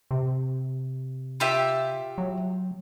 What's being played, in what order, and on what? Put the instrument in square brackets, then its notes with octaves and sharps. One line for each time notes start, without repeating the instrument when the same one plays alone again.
[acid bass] C3
[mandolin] F4 G4 E5
[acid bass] F#3